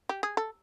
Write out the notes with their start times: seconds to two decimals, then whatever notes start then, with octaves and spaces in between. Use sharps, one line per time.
0.09 G4
0.23 G#4
0.37 A4